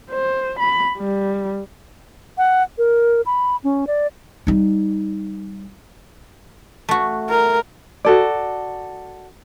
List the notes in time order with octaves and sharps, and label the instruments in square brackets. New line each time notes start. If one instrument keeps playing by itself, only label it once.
[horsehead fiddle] C5
B5
G3
[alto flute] F#5
A#4
B5
C#4
D5
[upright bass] G3 D#4
[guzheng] A3 F#4
[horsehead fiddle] A#4
[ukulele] F#4 A4 D5